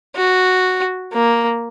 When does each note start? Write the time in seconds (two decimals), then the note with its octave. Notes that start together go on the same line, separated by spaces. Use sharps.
0.16 F#4
1.12 A#3